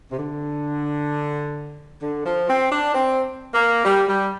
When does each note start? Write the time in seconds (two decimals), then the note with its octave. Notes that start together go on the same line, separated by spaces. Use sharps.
0.12 C3
0.19 D3
2.02 D3
2.25 F3
2.48 C4
2.70 D4
2.94 C4
3.54 A#3
3.85 G3
4.08 G3